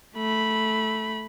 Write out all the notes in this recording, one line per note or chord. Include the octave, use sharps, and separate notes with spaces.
A3 B5